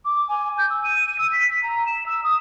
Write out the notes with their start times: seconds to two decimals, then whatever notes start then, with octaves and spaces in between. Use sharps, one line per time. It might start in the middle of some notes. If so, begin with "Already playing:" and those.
0.05 D6
0.29 G#5
0.58 G6
0.70 E6
0.84 D#7
1.19 E6
1.33 B6
1.50 B6
1.63 A#5
1.87 E7
2.06 E6
2.24 D#6